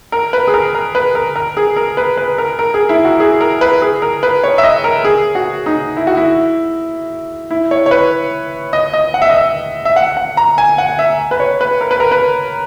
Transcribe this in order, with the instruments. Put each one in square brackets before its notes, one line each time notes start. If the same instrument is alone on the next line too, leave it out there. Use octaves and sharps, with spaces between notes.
[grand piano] A#4
B4
G#4
A#4
A#4
B4
A#4
A#4
G#4
A#4
B4
B4
A#4
A#4
G#4
E4
F#4
G#4
A#4
B4
G#4
A#4
B4
C#5
E5
D#5
A#4
G#4
F#4
D#4
E4
F#4
E4
E4
C#5
C#5
B4
D#5
D#5
F#5
E5
D#5
E5
E5
F#5
F#5
A#5
G#5
F#5
E5
B4
C#5
B4
A#4
B4
A#4
B4